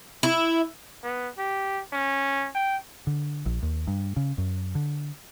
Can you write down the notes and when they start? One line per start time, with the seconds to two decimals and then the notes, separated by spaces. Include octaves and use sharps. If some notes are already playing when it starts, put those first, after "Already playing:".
0.23 E4
1.04 B3
1.38 G4
1.93 C#4
2.55 G5
3.07 D3
3.46 A#1
3.62 D#2
3.87 G2
4.16 C#3
4.38 F#2
4.75 D3